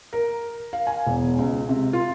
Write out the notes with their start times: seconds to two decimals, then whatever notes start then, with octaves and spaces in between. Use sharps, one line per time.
0.13 A#4
0.73 F5
0.87 G#5
1.06 E1
1.39 C#2
1.69 C3
1.93 F4